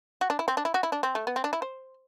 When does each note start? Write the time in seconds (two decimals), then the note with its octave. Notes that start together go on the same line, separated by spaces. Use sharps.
0.21 F#4
0.30 D4
0.39 E4
0.48 C4
0.57 D4
0.65 E4
0.74 F#4
0.83 E4
0.92 D4
1.03 C4
1.15 A3
1.27 B3
1.36 C4
1.44 D4
1.53 E4
1.62 C5